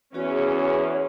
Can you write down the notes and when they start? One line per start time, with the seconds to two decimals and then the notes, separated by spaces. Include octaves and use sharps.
0.14 E2 C#4 F#4 G#4 C#5